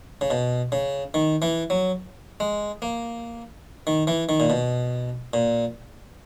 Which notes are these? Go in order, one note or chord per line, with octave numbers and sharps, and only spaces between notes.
C#3
B2
C#3
D#3
E3
F#3
G#3
A#3
D#3
E3
D#3
A#2
B2
A#2